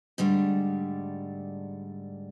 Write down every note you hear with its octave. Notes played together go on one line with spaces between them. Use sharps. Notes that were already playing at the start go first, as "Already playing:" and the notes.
G#2 D3 G3 A3